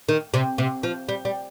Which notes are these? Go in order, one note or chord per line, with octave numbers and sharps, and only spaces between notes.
D#3
C3
C3
F3
G3
G3